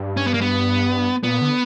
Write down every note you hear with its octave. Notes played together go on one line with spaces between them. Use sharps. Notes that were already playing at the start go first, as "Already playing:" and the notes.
Already playing: G2
C#4
B3
A#3
B3
A#2 B3
D3